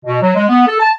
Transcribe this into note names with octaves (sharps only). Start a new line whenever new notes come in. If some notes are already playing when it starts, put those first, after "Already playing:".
B2
F#3
G#3
B3
A4
A5